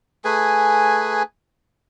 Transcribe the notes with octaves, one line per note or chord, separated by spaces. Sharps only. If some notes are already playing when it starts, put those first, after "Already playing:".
A3 G#4 B4 G#5